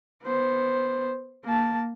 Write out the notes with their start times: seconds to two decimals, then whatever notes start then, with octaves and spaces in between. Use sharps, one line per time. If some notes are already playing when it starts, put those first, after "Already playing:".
0.23 B3 C5
1.45 A#3 A5